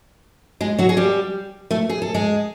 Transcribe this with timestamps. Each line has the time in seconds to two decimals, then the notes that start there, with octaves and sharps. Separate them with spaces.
0.61 G#3 G#4
0.79 F#3 F#4
0.89 G#4
0.97 G3 G4
1.71 A3 A4
1.89 G#4
2.02 A4
2.14 G#3 G#4